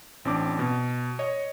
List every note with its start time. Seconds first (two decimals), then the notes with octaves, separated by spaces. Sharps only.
0.25 A1 C4 D4 D6
0.59 B2
1.19 C#5 D#5